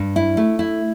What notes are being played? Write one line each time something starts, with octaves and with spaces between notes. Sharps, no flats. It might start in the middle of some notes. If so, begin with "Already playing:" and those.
Already playing: G2
E4
A3
E4